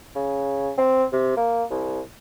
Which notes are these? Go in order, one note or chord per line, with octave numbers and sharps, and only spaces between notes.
C#3
C4
C3
A#3
C2